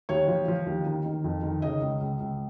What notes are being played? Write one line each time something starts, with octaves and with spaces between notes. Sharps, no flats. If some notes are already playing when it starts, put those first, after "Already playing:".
D#2 C#5
F3
F3
D#2
D#3
D#3
F2
D#3
C#3 D#5
C#2
C#2
C#2